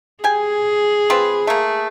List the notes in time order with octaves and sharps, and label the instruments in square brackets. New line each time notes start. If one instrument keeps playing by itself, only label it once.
[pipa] G4 G#5 [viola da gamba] G#4
[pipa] C4 F4 B4
A3 A#3